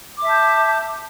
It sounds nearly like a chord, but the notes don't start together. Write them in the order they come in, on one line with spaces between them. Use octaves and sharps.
D6 E5 A5 G6